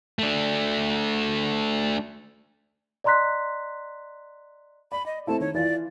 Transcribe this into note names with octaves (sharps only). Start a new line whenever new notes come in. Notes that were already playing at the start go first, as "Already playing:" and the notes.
A3 D4
D5 D#5 A#5 C6 F#6 B6
D5 B5
D#5
A3 C4 E4 A5
D#3 C#5
E3 F4 D5